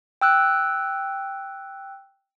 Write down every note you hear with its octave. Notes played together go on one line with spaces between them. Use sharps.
G5 E6 F#6